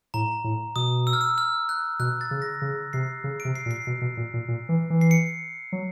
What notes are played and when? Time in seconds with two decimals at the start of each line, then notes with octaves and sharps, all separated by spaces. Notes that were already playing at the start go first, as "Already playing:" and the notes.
0.14 A2 A#5
0.44 A2
0.76 B2 D#6
1.07 E6
1.13 F6
1.21 E6
1.38 F6
1.69 F#6
1.99 B2 F#6
2.21 A6
2.31 C#3
2.42 A#6
2.62 C#3
2.93 C3 C7
3.24 C#3
3.40 D7
3.45 C3
3.55 C7
3.66 A#2
3.71 C7
3.87 B2
4.01 B2
4.17 A#2
4.34 A#2
4.48 A#2
4.69 E3
4.90 E3
5.01 C7
5.11 C#7
5.72 F#3